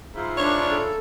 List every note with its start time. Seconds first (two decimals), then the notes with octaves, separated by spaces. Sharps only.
0.15 G#2 E4 F4
0.37 D4 C#5
0.71 A4